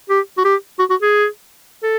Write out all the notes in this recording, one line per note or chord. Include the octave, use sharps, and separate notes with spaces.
G4
F#4
G4
F#4
F#4
G#4
A4